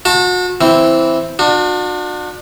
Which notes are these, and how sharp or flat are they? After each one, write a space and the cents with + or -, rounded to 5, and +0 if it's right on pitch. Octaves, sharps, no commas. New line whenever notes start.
F#4 -35 A5 +0
E3 +0 C4 +0
D4 +30 F#4 -40